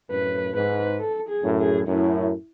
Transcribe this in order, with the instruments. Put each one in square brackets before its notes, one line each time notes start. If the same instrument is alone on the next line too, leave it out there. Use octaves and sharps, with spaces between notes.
[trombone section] F#2 A2 [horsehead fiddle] B4
[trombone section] G#2 [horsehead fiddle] B4
[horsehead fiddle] A4
G#4
[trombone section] F#2 A2
[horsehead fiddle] G#4
[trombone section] F#2 A2 [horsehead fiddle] E4